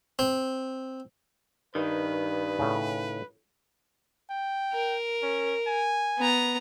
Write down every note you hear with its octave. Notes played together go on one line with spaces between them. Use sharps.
C4
G2 D#3 B4
A2 C#3
G5
A#4
C#4
G#5
B3 A#5